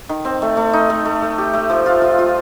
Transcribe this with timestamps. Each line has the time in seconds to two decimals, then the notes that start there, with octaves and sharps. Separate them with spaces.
0.09 D#3
0.25 C4
0.42 A3
0.57 A3
0.73 D#4
0.90 A3
1.05 A3
1.22 A3
1.38 G4
1.53 A3
1.69 F3
1.86 F4
2.02 F4
2.18 F4